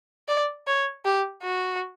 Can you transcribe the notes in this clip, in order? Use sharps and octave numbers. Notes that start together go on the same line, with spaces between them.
D5
C#5
G4
F#4